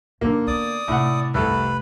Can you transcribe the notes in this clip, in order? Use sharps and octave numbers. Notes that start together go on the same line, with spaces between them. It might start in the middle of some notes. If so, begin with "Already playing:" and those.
G#2 D3 A#3
B3 D5 D#6
A2 C3 F#5
F1 C2 A4 B4